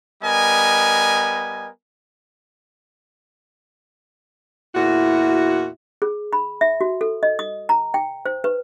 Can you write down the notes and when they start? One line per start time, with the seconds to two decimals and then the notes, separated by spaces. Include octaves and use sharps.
0.23 G3 B3 A#4 D#5 G#5
4.75 E2 A#2 E4 F#4
6.02 G#4
6.33 B5
6.61 E5
6.81 F#4
7.01 A4
7.23 D#5
7.39 D#6
7.69 A#5
7.94 G5
8.26 C5
8.44 B4